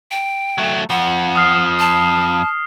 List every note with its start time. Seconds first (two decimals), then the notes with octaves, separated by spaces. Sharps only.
0.11 G5
0.58 F#3 A3
0.90 F2 F3 F#5
1.36 D#6 F6 C7
1.80 A5